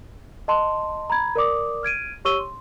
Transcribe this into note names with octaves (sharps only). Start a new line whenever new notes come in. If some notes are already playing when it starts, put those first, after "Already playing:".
D#5 A5 C6
A#5 B5 G#6
A#4 D5 D6 D#6
F6 G#6 D7 D#7
G4 C#5 C#6 E6 D#7 G7
C6